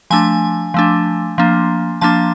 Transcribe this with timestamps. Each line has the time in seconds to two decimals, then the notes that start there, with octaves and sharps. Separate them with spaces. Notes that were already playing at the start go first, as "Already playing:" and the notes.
0.10 F3 A3 D4 G#5
0.74 F3 A3 D4
1.38 F3 A#3 D4
2.01 F3 A#3 D4 A5